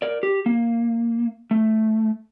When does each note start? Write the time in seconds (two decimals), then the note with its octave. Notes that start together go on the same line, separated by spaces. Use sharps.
0.02 A#4 D5
0.23 G4
0.46 A#3
1.51 A3